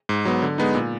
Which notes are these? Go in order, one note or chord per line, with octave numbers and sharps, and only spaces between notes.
G#2
F#3 B3
D3
G#3 B3 D#4
A#2